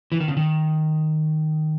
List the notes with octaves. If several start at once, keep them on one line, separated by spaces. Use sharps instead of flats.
E3
D#3
C#3
D#3